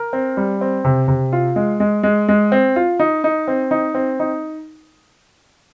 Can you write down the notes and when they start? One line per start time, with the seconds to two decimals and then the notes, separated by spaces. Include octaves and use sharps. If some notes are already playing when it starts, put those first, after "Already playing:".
Already playing: A#4
0.13 C4
0.37 G3
0.61 C4
0.84 C3
1.08 C3
1.33 F4
1.56 G#3
1.80 G#3
2.03 G#3
2.28 G#3
2.52 C4
2.76 F4
3.00 D#4
3.24 D#4
3.48 C4
3.71 D#4
3.95 C4
4.20 D#4